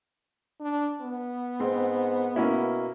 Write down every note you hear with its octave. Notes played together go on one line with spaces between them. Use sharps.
D4
B3
G#2 C4
B2 A#3 C#4 E4